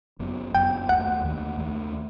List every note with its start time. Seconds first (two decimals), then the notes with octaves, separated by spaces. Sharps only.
0.19 F#1 F#2 F#3 B3
0.55 F#1 F#2 F#3 B3 G5
0.89 D#2 D#3 A3 F#5
1.24 D#2 D#3 A3
1.59 D#2 D#3 A3